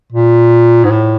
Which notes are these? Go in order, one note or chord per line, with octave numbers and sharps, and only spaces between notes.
A#2
G#2
A2